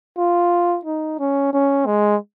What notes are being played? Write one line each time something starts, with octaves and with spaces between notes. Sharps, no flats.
F4
D#4
C#4
C#4
G#3